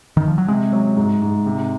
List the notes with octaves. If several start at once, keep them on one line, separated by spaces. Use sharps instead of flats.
D#3
F3
F#3
C3 G#3
F#3
G#2
G#2
C3